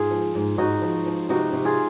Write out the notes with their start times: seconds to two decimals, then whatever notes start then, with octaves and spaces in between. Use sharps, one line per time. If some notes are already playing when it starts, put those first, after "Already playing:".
Already playing: G#2 F4 G#4
0.11 F3
0.35 G#2
0.58 G#2 D#4 F#4
0.82 F3
1.06 F3
1.29 C3 D#4 F#4
1.53 C3
1.65 F4 G#4